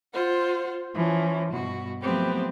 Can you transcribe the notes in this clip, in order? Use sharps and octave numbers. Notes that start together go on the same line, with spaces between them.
F4 C5 F#5
E3 F3 C#4
G2 B2 F#4
F3 F#3 A3 B3 C4 G4